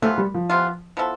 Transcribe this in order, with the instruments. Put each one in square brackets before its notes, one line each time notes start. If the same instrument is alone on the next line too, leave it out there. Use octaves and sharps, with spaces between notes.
[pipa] C3 E3 B3 F4 [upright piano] A3
[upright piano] G3
F3
[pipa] C3 E3 B3 F4
F3 B3 E4 A4